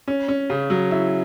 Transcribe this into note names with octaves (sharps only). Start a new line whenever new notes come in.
C#4
C#4
C#3
F#3
E4